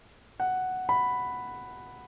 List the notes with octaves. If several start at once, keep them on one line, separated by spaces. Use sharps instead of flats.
F#5
B5